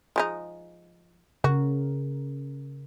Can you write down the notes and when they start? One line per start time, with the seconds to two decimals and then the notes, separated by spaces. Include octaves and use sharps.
0.16 F3 G#3 D#4
1.44 C#3 F#4 A#4